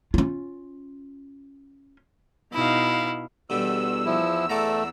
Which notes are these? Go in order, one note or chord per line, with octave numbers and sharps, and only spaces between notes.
C#4 F4
B2 D#4 E4 F5
E2 B2 D3 G3 E6
F3 E4
A3 D5 F#5 A#5